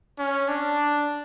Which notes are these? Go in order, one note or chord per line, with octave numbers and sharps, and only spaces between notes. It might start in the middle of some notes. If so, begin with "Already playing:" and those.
C#4
D4